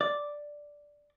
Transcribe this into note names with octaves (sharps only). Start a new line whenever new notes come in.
D5